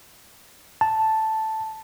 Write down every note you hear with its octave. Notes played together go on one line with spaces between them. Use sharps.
A5